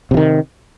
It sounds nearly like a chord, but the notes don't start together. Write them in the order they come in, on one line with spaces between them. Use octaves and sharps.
C3 F3 D#3